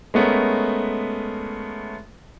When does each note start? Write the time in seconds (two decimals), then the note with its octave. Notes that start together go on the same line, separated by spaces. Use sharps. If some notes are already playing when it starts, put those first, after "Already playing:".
0.14 G#3 A3 B3 C#4 A#4